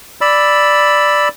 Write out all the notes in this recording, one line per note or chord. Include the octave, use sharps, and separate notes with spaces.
D5 B5 E6